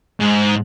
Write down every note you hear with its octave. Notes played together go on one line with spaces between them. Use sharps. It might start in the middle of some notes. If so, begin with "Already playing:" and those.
G#2